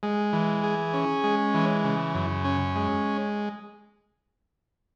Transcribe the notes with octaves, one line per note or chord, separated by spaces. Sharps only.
G#3
E3
G#4
C#4
G#3
E3
C#3
F#2
C#4
G#3